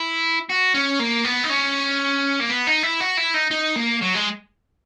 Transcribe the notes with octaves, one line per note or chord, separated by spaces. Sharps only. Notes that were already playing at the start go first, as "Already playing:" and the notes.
Already playing: E4
F#4
C#4
A#3
B3
D#4
C#4
A#3
B3
D#4
E4
F#4
E4
D#4
D#4
A#3
F#3
G#3